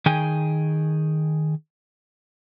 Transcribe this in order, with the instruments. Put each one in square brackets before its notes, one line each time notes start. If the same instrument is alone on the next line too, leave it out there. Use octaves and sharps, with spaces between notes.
[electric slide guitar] D#3 G#4 G5 G#5